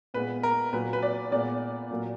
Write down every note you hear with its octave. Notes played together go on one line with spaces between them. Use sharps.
A#2 G#3 B3 B4
A#4
A#2 F#3 A#3 B4
B4
D5
A#2 G#3 B3 D5
A#2 F#3 A#3